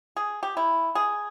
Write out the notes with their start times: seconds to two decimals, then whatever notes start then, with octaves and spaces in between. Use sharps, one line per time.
0.16 G#4
0.43 G4
0.57 E4
0.95 G#4